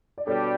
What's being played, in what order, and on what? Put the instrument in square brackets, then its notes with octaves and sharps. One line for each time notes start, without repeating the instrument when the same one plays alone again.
[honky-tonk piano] D5
[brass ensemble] B2 G3 D4 G4 [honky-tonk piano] A4 C#5